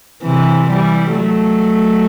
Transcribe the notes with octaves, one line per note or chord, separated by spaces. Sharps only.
C3 E3
E3 G3
F#3 A3